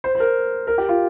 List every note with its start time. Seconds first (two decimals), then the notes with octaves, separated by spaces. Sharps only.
0.04 C5
0.15 C5
0.20 A#4
0.67 A#4
0.78 G4
0.89 F4